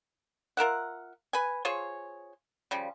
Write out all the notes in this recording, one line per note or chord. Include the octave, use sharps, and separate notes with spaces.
F4 A#4 E5 F#5
B4 G#5
F4 G#4 C5 C#5
C#3 F3 G3